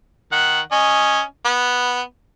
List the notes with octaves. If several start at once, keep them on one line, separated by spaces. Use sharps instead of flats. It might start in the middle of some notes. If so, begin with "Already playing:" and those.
D#3 F#5
C#4 D#5
B3